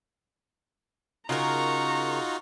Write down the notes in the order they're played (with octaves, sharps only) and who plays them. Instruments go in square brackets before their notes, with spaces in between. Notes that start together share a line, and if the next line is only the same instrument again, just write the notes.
[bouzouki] C#3 A#4 [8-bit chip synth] D#4 F4 F#4 [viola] A#5 C#6